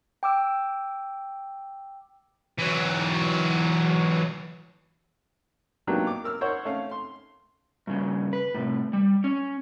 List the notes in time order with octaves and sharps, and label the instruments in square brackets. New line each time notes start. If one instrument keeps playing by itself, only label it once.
[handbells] G5 D6 E6
[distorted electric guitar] E3 F#3
[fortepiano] F#3 A#3 B3 D4 D#4 G4
D6
A#4 E6 F6
A#4 C5 C#5 F#5 C#6
A3 C#4 F5
C6
[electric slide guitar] G2 C#3
B4
A2 C3
G3
C#4